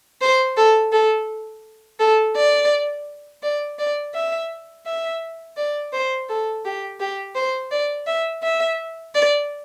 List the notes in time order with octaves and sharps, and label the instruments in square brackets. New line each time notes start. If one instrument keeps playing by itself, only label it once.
[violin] C5
A4
A4
A4
D5
D5
D5
E5
E5
D5
C5
A4
G4
G4
C5
D5
E5
E5
D5